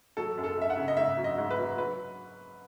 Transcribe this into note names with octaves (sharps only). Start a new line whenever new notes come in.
F#3 A4
F#2
A4
F#2 E5
F#5
C#3
D#5
G#2 E5
F#3
D#5
G#2
B4
F#3
F#3 B4